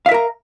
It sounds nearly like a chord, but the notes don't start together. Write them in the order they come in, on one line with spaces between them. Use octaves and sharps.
F5 E5 A#4 A#5